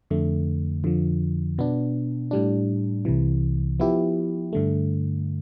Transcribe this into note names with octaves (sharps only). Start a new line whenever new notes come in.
F2 D3 A3
F2 D3 F3
B2 B3 D4
A2 G3 D4
C2 C3 E3
F3 B3 E4 G4
G2 D3 A3